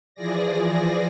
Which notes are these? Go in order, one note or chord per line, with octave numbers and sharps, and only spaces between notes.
E3 F3 G#4 D5 A#6